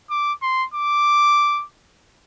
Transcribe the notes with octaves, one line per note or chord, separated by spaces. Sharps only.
D6
C6
D6